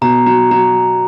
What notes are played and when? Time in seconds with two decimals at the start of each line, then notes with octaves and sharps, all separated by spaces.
0.01 B2 A#5
0.26 F#3 A#5
0.51 F#3 A#5